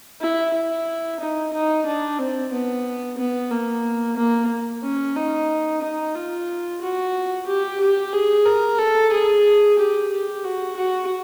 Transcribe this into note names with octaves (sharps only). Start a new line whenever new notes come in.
E4
E4
D#4
D#4
D4
C4
B3
B3
A#3
A#3
C#4
D#4
D#4
F4
F#4
G4
G4
G#4
A#4
A4
G#4
G4
G4
F#4
F#4